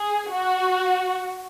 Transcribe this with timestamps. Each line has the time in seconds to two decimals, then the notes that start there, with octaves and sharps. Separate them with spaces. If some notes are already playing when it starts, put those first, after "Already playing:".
Already playing: G#4
0.32 F#4